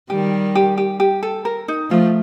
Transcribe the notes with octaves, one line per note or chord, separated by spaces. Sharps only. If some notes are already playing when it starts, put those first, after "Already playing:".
D#3 G3 G4
G4
G4
G4
A4
A#4
D#4
F3 A3 F4